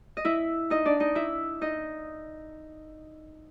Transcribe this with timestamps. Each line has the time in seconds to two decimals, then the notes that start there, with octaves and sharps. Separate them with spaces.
0.17 D#5
0.25 E4 E5
0.70 D#4 D#5
0.85 D4 D5
1.00 D#4 D#5
1.15 E4 E5
1.61 D#4 D#5